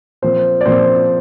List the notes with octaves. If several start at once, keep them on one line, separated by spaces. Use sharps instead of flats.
A#2 F3 C4 C5
D5
A#2 F3 C4 C5